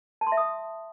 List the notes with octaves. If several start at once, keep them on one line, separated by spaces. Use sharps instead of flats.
A5
C6
E5
D#6